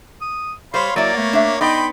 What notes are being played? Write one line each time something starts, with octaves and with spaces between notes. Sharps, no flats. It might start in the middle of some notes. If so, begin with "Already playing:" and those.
D#6
G3 C5 C#5 F5 B5 C6
F#3 A#3 E4 C#5 D5
A3 B3
D4 E5
B3 D#4 D5 D#5 G5 B5 C6